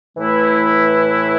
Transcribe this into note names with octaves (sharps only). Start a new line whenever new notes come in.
A2 E3 A3 E4 B4